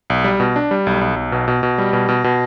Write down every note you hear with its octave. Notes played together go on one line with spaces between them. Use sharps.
B1
G3
B2
D4
G3
B1
B1
B1
B2
B2
B2
G3
B2
B2
B2